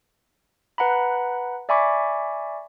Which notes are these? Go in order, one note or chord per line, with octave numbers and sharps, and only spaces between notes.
B4 F#5 A#5 B5
D5 E5 G#5 B5 C#6 D6